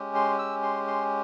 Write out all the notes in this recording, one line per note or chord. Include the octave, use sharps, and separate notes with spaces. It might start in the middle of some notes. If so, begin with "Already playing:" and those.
Already playing: G#3 C#4 G4
C6
E6
C6
C6